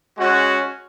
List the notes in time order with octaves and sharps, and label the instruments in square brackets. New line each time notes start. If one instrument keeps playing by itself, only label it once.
[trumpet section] G#3 C#4 F#4